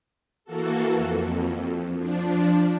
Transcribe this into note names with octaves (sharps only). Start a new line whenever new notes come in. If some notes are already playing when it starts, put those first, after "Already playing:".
E3 A#3 F#4 A4
F2
F3 D4